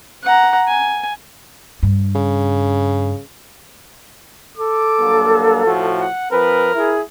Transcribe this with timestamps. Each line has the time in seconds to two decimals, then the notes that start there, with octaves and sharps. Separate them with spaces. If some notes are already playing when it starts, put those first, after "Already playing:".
0.24 F#5 A#5
0.68 G#5
1.83 G2
2.15 C#3
4.57 A4 D6
5.00 G2 F#3 A#3
5.66 A2 F3 F#4
6.00 F#5
6.31 F3 C4 A#4 B4
6.75 E4 G#4